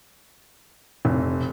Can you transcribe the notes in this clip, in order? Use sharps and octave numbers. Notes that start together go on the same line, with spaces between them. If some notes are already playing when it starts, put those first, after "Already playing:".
F1